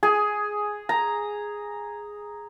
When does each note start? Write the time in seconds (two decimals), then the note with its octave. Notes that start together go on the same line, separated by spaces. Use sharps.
0.03 G#4
0.89 A#5